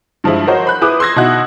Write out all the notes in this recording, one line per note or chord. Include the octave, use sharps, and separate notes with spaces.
G2 F3 G#3 E4
F#4 A#4 C5 C#5 D#5
B5 F#6 G6
E4 G#4 B4 D6 D#6
C6 E6 G#6 A#6
B2 D#4 E4 F#4 F#6